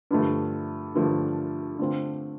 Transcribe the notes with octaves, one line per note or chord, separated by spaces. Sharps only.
G2 D3 F3 A3
G2 D3 F3 A3
D3 A3 C4 F4